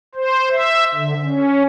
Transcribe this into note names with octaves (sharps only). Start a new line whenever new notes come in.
C5
E5
D3
C#4